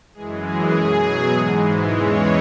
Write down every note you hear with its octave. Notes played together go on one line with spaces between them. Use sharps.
F#2 E3 G#3 G#4
G#4
B2 F#3
G#2 E3 G#3
E2 C#3 E3 G#3 C#5